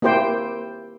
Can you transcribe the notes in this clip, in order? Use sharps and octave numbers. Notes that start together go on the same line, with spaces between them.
A#3 E4 G4 C5 G5